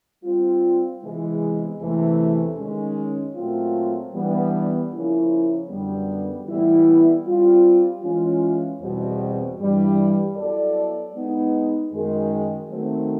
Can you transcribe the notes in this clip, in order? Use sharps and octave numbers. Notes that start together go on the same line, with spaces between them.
G3 C4 F4
C3 E3 G#3 B3
E2 C3 E3 A3
D#3 G#3 C#4
A#2 F#3 A3 C4 F4
E3 G3 B3 D4
C#3 F3 A#3 C#4 E4
F#2 D3 G3 B3
A2 E3 G3 B3 E4
G3 C4 F4
E3 G#3 C#4 F4
E2 B2 G3 C4
G2 E3 G3
F#3 B3 E4 A4 D5
G#3 B3 D#4
F#2 D#3 G#3
D#3 F#3 A3 C4